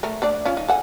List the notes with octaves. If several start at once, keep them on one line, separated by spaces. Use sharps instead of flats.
A3 A#4
A3 D4 D5
C#4 F4
D#4
A4 F#5 G#5